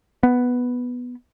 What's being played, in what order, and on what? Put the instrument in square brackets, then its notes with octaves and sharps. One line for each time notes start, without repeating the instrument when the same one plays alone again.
[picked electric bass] B3